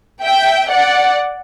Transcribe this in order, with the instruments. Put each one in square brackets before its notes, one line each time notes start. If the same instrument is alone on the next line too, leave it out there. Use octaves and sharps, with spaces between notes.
[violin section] E5 G5
D5 F#5